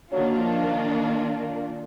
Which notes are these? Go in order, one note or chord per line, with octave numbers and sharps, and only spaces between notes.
D#3 F#3 A#3 D4 F4
F3
A#2